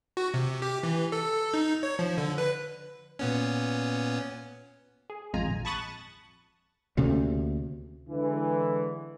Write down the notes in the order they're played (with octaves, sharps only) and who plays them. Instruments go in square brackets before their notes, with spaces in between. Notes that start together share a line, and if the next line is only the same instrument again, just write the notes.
[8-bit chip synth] F#4
C3
G4
E3
A4
D#4
C#5
F3
D3
B4
A#2 B3 C#4
[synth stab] G#4
G#1 F2 G#3 F4 G#5 A#5
A#1
A5 B5 C#6 D#6 F#6 A6
[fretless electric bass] D2 C3 A#3 C#4
[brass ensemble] D3 E3 G#3